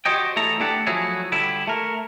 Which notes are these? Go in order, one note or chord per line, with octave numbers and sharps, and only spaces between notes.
F#4 G4 C5 C#5 D#5 G5
E2 A3 E4 A4 A#5
A3 D4 E4 G4 A4 F#5
F3 F#3 A3 E4 F#4 G#4
D3 G3 E4
A3 A#4